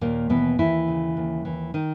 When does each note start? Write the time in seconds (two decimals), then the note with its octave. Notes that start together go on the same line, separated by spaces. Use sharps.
0.01 D#2 A#2 A#3
0.30 B2 E3 B3
0.58 D#2 E3 E4
0.88 C#3
1.17 D#2
1.45 E3
1.74 D#3 D#4